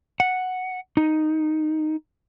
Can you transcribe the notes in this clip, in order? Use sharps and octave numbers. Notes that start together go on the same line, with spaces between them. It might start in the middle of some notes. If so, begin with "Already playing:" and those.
F#5
D#4